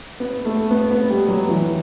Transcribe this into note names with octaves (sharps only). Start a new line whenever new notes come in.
B3
A3
B3
B3
G3
F#3
E3